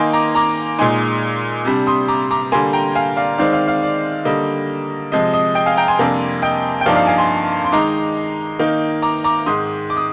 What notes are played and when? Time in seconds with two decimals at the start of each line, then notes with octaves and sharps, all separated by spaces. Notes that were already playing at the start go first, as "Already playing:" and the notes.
Already playing: D#3 A#3 D#4 G#5 C6
0.13 A#5 D6
0.35 A#5 D6
0.79 A#2 G#3 D#4 G#5 C6
1.65 C3 G3 D4
1.87 C6 D#6
2.08 A#5 D6
2.31 A#5 D6
2.52 D3 G3 A#3 G#5 C6
2.73 G5 A#5
2.95 F5 G#5
3.17 D5 F5
3.38 D#3 G#3 C4 D5 F5
3.53 D5 F5
3.67 D5 F5
3.83 D5
4.25 D3 G3 A#3 D#5
5.12 C3 F3 G#3 D#5
5.34 D#5
5.55 D#5 G5
5.66 F5 G#5
5.77 G5 A#5
5.88 G#5 C6
5.99 F2 C3 G3 A#3 D4
6.42 D#5 G5
6.81 G5
6.86 G2 F3 A#3 D#4 D5 F5
6.96 D5 F5
7.07 F5 G#5
7.18 G#5 C6
7.65 C6
7.72 D#3 G#3 D#4 A#5 D6
8.59 D#3 A#3 D#4
9.02 A#5 D6
9.24 A#5 D6
9.46 G#2 D#3 G#3 C6 D#6
9.90 D6
9.97 D#6